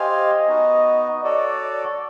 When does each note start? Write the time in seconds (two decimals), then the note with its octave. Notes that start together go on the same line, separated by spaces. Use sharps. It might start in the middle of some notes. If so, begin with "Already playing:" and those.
Already playing: G4 C5 D#5 F5 G#5
0.47 B3 D#4 F#4
1.24 F#4 A4 C#5 D5